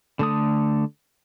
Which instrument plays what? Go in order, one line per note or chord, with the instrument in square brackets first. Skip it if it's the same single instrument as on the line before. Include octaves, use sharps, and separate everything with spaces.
[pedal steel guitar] D3 A3 D#6